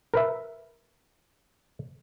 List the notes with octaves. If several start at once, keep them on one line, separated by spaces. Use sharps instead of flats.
A#4 B4 E5